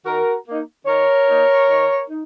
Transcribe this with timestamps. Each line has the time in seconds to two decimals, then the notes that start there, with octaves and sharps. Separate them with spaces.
0.05 D#3 F#4 A#4
0.46 A#3 D#4
0.86 D#3 A#4 C#5
1.28 A#3 D#4
1.68 D#3
2.09 D#4